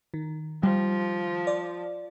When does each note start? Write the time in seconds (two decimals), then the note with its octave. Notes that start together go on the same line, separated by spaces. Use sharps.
0.14 D#3
0.63 F3 G3
1.47 D5